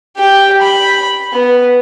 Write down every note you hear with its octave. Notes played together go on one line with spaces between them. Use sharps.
G4 G5
B5
B3